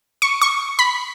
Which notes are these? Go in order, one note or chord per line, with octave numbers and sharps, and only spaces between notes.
C#6
C#6
B5